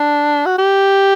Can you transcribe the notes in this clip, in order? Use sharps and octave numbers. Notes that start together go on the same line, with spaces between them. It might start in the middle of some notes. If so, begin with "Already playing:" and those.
Already playing: D4
F#4
G4